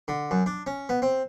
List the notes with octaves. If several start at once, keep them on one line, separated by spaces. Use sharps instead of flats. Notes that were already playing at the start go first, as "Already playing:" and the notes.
D3
F#2
D4
C#4
B3
C4